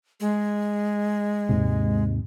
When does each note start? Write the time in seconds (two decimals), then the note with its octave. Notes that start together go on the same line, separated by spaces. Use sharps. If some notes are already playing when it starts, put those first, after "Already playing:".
0.20 G#3
1.49 D#2 G#2 C3